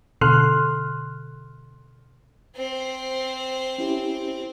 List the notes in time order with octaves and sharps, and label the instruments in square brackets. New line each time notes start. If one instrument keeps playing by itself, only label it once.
[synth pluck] B2 D3 A4 C6 F6 F#6
[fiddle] C4 C5
[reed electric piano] C#4 E4 G4